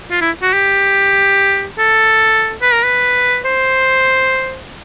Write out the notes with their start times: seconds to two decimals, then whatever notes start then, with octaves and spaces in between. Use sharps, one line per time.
0.11 F4
0.21 E4
0.42 F#4
0.53 G4
1.78 A4
2.62 B4
2.73 A#4
2.83 B4
3.45 C5